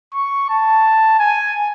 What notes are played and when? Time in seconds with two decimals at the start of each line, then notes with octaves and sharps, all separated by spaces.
0.14 C#6
0.50 A5
1.19 G#5